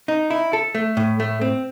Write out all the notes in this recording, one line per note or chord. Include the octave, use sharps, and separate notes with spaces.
D#4
E4
A4
A3
A2
A3
C4